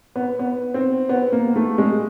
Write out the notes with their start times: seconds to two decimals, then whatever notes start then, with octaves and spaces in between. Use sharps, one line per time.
0.16 B3
0.39 B3
0.74 C4
1.09 B3
1.32 A#3
1.56 A3
1.78 G#3